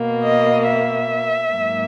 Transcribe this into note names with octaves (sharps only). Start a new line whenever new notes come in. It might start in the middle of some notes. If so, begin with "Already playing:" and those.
Already playing: B2 A#3
D#5
E5
G#2 F#3 A#3